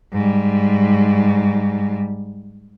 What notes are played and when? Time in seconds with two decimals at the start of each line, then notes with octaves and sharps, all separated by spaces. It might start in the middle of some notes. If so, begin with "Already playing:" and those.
0.12 G#2 G3